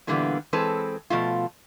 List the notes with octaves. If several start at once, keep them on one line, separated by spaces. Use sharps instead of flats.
A#2 D3 E3 G3 A#3 B3
E3 G#3 C4 A4 B4
B2 F3 A3 F4